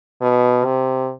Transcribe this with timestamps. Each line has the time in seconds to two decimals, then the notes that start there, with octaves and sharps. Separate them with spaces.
0.22 B2
0.65 C3